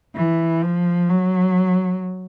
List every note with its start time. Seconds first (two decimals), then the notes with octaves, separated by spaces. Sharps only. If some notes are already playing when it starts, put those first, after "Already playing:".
0.15 E3
0.62 F3
1.09 F#3